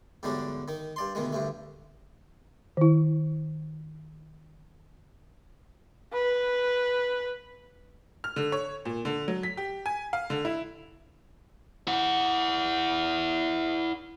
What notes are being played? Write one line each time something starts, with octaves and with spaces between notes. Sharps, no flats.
E2 G#2 D3 F#3 G3 D4
D#3 D#4
G2 D5 C6
D2 B2 D#3 G#3
D2 G2 A3
D#3 E4
B4
F6
D3
C#5
A#2
D3
F#3
B6
G4
G#5
F5
D3
E4
E4 F#5